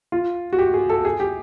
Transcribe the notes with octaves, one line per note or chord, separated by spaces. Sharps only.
F4
F#4
G4
G#4
A4
G#4
G4